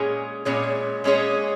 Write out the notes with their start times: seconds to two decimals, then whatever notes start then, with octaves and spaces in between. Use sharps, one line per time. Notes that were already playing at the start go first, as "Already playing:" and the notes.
Already playing: A#2 G#3 C#4 G#4 C#5
0.45 A#2 G#3 C#4 G#4 C#5
1.04 A#2 G#3 C#4 G#4 C#5